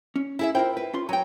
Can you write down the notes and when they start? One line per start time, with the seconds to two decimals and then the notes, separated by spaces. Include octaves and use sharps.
0.16 C#4
0.39 E4 G#4 E5
0.55 E4 F4 A#4 C5 G5
0.77 B4
0.94 C#4 F4 C6
1.09 F#3 G5 G#5 A#5